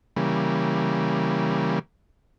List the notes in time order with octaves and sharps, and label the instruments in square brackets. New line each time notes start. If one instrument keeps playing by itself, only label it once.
[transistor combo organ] C#3 E3 G3 A#3